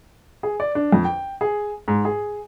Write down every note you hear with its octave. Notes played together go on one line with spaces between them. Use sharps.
G#4
D5
D4
F2
G5
G#4
G#2
G#4